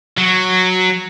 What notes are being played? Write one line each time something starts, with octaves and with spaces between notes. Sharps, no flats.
F#3